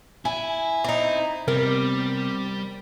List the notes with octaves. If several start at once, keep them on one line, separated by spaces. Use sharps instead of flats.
E4 G#5
C4 D#4
C3 G3 B3 C4 A#4